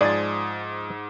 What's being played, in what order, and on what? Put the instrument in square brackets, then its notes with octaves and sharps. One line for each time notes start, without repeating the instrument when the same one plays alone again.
[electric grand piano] G#2 D#6 A6 [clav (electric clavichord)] F3 G#3 G#4 [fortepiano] D5